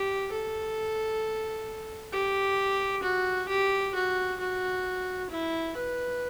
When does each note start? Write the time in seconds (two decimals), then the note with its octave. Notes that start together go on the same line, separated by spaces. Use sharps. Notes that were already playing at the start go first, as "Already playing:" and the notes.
Already playing: G4
0.31 A4
2.13 G4
3.03 F#4
3.48 G4
3.95 F#4
4.40 F#4
5.30 E4
5.77 B4